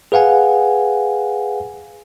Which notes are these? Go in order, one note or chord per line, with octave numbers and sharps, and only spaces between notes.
G#4 B4 F5 F#5 G#5